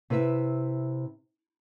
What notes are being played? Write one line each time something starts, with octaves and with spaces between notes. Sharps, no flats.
C3 E4 B4 C5 E5